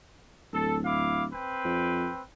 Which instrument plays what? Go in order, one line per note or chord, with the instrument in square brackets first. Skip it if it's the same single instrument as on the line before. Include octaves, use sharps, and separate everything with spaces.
[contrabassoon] D1 [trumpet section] A4
[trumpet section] E4 F5 D6
C4 B4 G5
[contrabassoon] F2